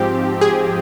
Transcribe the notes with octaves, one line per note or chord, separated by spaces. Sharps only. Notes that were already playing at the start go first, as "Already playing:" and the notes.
Already playing: G#2 F3 C4 G4
G#4